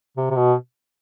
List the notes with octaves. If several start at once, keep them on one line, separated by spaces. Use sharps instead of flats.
C3
C3
B2